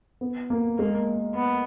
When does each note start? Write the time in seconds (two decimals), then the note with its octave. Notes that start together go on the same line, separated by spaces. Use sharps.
0.21 B3
0.50 A#3
0.78 G#3 A#3
1.35 B3